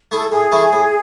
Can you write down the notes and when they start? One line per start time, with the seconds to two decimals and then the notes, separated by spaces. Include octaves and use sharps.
0.11 A3 E4 G#4 A4
0.31 A2 G#4
0.52 E3 A3 C#4 E4
0.72 A2